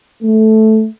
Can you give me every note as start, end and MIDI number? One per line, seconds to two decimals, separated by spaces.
0.23 0.86 57